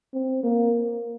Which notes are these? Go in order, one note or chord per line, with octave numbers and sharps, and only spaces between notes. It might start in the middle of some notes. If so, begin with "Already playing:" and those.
C4
A#3